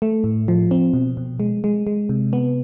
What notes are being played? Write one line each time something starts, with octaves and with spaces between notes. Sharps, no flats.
A3
A2
F3
C4
B2
B2
G#3
G#3
G#3
C3
B3